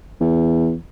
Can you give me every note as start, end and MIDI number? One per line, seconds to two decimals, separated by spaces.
0.21 0.75 40